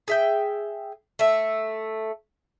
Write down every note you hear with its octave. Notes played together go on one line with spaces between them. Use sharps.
G#4 E5 G5
A3 E5